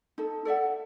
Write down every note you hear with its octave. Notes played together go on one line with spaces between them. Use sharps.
D#4 A4
A4 D5 E5 F#5